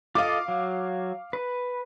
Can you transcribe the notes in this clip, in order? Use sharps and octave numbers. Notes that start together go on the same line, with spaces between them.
F4 A4 D#5 F5 D6
F#3
B4